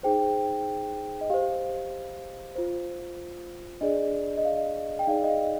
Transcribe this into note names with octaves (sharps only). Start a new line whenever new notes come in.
D#4 G#4 C5 G5
D#5
G4 C5 F5
F4 C5
D4 G#4 D5 D#5
D#5
F5
G5
D#4 G#4 D5 F5
D#5
F5